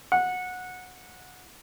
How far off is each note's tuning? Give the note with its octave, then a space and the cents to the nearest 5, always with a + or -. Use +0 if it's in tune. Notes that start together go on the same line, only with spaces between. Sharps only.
F#5 -15